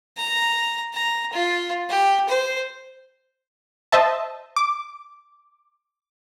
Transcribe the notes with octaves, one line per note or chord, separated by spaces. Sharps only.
A#5
A#5
F4
G4
C5
C5 D#5 E5 A5
D6